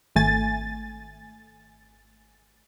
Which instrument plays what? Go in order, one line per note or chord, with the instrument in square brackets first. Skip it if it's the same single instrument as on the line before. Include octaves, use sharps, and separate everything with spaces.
[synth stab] G#1 A3 G#5 A6